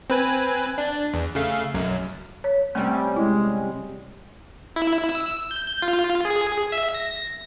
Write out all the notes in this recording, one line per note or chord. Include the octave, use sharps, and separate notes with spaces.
C4 B4 G#5
D4
E2
C#3 A3 F5
B1 F#2
C#5
C3 G3 A3 C4 C#4
G#3 E4
E4
E6
G6
F4
G#4
E5
A#6